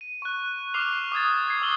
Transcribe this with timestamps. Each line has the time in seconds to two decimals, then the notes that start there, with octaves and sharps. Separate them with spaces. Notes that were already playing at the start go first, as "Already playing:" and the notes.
0.01 D#7
0.22 C#6 F#6
0.74 C#6 D6 F6 C7 F7
1.12 D6 D#6 G#6 A6
1.47 G#6 C7
1.62 C#6 D#6 E6 F#7 G7